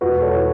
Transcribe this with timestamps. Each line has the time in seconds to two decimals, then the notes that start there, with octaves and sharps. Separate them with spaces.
0.01 E1 F#4 B4
0.22 A4 C#5
0.35 E3